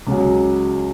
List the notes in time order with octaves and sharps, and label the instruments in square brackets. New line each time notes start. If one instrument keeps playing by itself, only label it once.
[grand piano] C#2 C#3 F#3